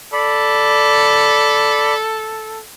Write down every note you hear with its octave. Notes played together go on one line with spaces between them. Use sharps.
A4 D5 B5